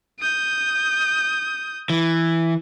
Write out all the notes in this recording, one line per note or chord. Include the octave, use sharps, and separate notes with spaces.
D#6 G6
E3